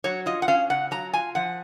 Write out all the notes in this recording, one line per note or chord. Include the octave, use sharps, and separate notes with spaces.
F#3 C#5
F4 D#5
F#5
C#4 F5
C#3 F#5
F#3 A#5
F4 G#5
F3 F#5